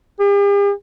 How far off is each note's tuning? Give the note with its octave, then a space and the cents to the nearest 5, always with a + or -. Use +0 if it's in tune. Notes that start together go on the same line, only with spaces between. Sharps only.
G4 +45